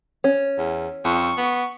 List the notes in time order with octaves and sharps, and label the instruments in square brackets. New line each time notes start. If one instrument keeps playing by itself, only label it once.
[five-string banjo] C#4
[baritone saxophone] E2
[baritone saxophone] F2 [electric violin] C#6
[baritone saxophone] B3